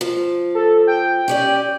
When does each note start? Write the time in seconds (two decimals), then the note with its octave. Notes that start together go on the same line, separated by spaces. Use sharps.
0.01 F3
0.55 A4
0.87 G5
1.28 C#4 G4 D5